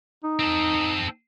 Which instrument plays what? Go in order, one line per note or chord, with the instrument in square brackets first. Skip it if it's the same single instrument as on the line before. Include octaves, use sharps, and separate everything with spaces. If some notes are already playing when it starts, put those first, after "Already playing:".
[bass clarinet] D#4
[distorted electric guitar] C4 A4